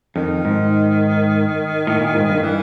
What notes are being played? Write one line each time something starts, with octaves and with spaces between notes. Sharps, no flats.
F2 D#3
G#2
A2
A#2
G#2
G2
E3